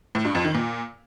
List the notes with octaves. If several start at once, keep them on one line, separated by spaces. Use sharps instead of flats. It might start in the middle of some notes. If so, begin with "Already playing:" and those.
A2
G2
F2
D#3
A#2